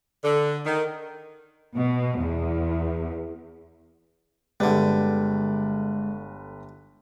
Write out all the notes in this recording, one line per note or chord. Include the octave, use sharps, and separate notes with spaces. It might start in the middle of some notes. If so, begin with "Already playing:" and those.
D3
D#3
B2
E2
G1 D3 G3 G#3 B4